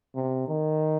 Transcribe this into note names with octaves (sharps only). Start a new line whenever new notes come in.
C3
D#3